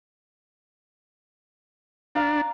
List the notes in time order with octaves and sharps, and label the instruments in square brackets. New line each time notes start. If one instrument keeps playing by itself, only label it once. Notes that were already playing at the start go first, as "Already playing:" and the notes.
[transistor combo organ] D4 [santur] F5 A#5